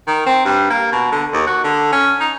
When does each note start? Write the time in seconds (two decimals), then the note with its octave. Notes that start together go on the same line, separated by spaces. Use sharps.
0.07 D#3
0.26 C4
0.45 G2
0.70 A#3
0.92 B2
1.12 D3
1.33 D#2
1.47 F#4
1.64 D3
1.92 C#4
2.20 D#4